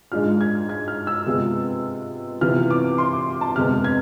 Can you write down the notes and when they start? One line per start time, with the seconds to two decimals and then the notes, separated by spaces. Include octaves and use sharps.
0.12 G#2 G#3 D4 F4 F6
0.41 G#6
0.69 G#6
0.88 F6
1.07 E6
1.26 C3 G#3 B3 F4
2.41 C3 E3 B3 F4 F6
2.70 D6
2.98 C6
3.13 D6
3.41 A5
3.56 F2 C3 G#3 B3 F6
3.84 G#6